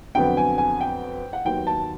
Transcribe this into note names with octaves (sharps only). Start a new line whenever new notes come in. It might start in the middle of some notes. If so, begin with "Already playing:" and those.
F2 D3 F#3 B3 G5
G#5
G#5
G5
F#5
D#2 D#3 F#3 B3 G5
A5